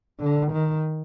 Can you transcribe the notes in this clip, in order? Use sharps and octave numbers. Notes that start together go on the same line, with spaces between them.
D3
D#3